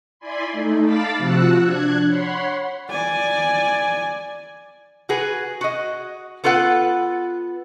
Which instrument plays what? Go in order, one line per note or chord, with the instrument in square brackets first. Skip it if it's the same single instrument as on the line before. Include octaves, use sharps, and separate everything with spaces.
[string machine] E4 D5 G#5 B5 C6
A3 D#4
F5 A5 B5 D6 A6 B6
C3 F3 F#4 F#5 E6 F#6
D4 F#6 G#6
C#5 F#5 B5 C6
[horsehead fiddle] D5 G#5
[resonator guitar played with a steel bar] F#4 G#4 B4
F#4 D#5
B3 F4 A4 B4 F#5